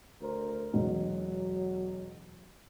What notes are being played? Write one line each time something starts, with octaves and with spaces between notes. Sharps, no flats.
D2 A#4 C5
E1 B2 F#3